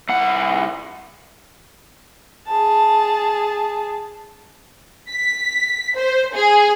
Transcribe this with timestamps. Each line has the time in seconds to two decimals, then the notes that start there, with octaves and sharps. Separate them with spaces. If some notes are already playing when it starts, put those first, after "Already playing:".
0.09 C2 F#5
2.47 G#4 A5
5.11 B6
5.97 C5
6.35 G#4